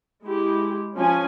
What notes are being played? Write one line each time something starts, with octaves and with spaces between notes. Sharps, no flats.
G#3 E4 G4
F3 C#4 G#5